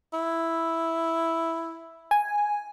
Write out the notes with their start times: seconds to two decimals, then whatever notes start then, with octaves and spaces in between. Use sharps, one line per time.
0.13 E4
2.11 G#5